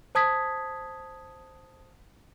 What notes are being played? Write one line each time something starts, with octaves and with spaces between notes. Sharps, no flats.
C5 A5 D#6 G#6 B6